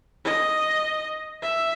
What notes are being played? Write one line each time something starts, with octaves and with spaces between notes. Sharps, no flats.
D#5
E5